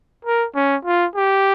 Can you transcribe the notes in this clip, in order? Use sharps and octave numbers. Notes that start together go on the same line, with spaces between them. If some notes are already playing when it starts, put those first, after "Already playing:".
A#4
C#4
F4
G4